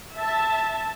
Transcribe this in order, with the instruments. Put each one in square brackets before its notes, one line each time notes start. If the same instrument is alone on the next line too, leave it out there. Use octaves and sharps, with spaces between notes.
[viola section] E5 A5